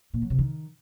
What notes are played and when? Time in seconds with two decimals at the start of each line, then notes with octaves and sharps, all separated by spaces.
0.14 A#2
0.22 F#3
0.30 C3
0.38 D#3